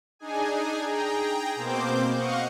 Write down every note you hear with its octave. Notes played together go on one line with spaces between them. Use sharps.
D4 D#4 G#4 G#5
G#4 G5 A#5
B2 A#3 C4 C5 D6 G6
D#5 F5 F#5 C#6